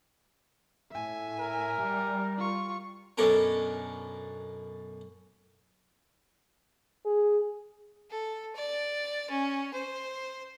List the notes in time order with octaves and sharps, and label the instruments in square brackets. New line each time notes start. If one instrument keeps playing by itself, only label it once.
[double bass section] A2 [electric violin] E5 G#5
[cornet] A#4
[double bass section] G3
[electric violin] F4 C#6
[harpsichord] F#2 B2 C#4 D4 A4 A#4
[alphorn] G#4
[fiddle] A4
D5
C#4
C5